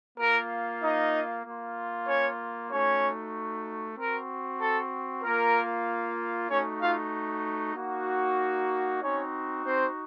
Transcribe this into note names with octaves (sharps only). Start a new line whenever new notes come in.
A#3 F4 A#4
D#4 D#5
A#3 F4
C#4 C#5
A3 C#4 D#4 F#4 C#5
C4 F#4 A#4
A4
A#3 F4 A#4
A3 C#4 D#4 F#4 C#5
F4 F5
A#3 D#4 F#4
C4 C#4 D#4 F#4 C#5
C4 C5